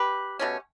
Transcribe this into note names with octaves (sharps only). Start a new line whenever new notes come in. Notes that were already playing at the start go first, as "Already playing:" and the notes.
Already playing: G4 B4
B2 A3 C#4